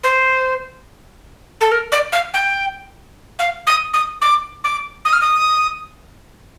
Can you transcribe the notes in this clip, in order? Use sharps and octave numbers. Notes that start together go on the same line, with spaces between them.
C5
A4
A#4
D5
F5
G5
F5
D#6
D#6
D6
D6
D#6
F6
D#6